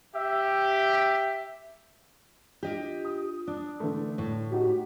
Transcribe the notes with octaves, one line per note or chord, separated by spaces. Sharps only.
G4 E5
D4 F4 G4 D#5
D#6
D4 A5
D3 E3 A3
A2
D#4 F#4 G4